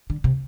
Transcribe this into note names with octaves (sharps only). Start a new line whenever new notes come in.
D3
C3